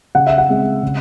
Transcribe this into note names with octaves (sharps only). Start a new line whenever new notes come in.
C#3 F#5
E5
F#5
G#3 C4
C#3